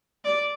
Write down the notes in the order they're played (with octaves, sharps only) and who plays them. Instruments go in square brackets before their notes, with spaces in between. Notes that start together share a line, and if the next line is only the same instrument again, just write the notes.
[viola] D5